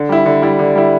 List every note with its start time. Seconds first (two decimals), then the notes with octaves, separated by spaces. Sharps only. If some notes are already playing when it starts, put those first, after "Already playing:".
Already playing: D3
0.09 G3 E4
0.26 D3
0.42 G3 E4
0.59 D3
0.75 G3 E4